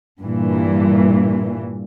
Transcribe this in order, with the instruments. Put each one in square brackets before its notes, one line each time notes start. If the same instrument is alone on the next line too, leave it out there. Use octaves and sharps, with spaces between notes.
[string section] G2 A#2 E3